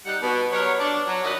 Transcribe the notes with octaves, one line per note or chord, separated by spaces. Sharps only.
G3 D#4 F#5
B2
F#3 G3 B3 A#4 C#5
D4
F#3
F#2 D#3 C#4 B4 D5 D#5